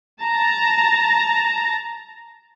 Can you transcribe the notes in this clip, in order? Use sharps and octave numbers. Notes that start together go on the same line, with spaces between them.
A5 A#5